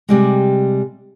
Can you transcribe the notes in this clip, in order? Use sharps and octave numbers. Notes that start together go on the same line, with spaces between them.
C3 G3 G#3